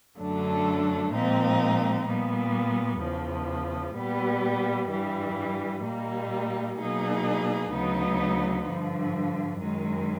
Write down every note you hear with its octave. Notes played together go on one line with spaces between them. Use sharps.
F#2 D3 F#3 A3 D4
A#2 F3 G#3 C4 D#4
A#2 G3 B3
E2 C#3 F3
A#2 G3 B3
G2 E3 G3
A#2 G3 A#3 D#4
B2 F#3 A#3 D#4 G#4
D2 C#3 F#3 B3 D#4
G2 D3 F3
F#2 D#3 G#3